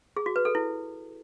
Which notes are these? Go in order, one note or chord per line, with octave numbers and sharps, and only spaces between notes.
G#4
F#4
B4
A4
E4